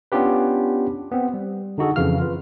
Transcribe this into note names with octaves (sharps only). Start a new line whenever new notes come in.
B3 C#4 D4 F4 G4 B4
B3 C4
G3
D3 D#4 F#4 G#4 A4
F2 C#3 E3 F5 F6
F4 B4